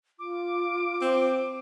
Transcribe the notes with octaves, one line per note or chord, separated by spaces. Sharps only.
F4 D6
C4 C5